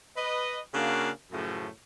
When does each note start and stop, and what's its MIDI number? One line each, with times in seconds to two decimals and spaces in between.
0.16 0.59 71
0.16 0.59 75
0.74 1.10 49
0.74 1.10 58
0.74 1.10 62
0.74 1.10 66
0.74 1.10 77
1.32 1.68 42
1.32 1.68 45
1.32 1.68 49
1.32 1.68 53
1.32 1.68 57